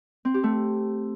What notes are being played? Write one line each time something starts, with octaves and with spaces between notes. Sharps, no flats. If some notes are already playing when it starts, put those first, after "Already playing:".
C4
G4
A3